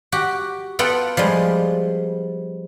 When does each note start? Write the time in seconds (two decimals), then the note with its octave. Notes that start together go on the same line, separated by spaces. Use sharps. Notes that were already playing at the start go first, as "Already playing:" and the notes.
0.12 F#4 G4
0.79 B3 F4 A4 F#5 G5
1.17 F3 G3 G#3